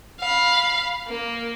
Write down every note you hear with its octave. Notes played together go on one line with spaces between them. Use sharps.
F5 B5
A#3